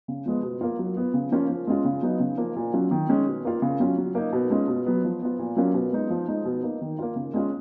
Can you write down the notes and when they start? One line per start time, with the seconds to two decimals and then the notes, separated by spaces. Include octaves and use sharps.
0.08 C#3
0.26 F3 G#3 B3
0.43 B2
0.61 A#3 F4
0.79 F#3
0.97 B3 F4
1.14 C#3
1.32 F3 A#3 C#4 F4
1.50 F3
1.67 G#3 C#4 F4
1.85 C#3
2.03 F#3 B3 D#4
2.20 C#3
2.38 F3 A#3
2.56 A#2
2.74 F#3 C#4 F4
2.91 D#3
3.09 G#3 C#4
3.27 B2
3.45 A#3 F4
3.62 C#3
3.80 F#3 C#4 F4
3.98 F#3
4.15 A#3 D#4
4.33 B2
4.50 G#3 C#4 F4
4.68 B2
4.86 F#3 B3
5.04 F3
5.22 B3 F4
5.39 A#2
5.56 F#3 A#3 C#4 F4
5.74 B2
5.92 G#3 B3 D#4
6.10 F3
6.28 G#3 D#4
6.45 B2
6.63 A#3 D#4
6.82 D#3
6.99 A#3 F4
7.16 C#3
7.34 G#3 C#4 F4